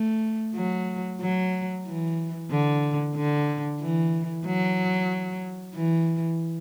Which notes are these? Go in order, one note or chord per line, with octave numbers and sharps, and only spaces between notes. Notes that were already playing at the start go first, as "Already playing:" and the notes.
Already playing: A3
F#3
F#3
E3
D3
D3
E3
F#3
E3